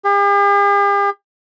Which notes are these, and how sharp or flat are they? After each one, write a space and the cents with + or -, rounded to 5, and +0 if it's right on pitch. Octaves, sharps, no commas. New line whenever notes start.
G4 +45